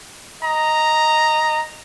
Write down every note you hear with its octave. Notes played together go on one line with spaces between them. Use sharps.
D#5 A#5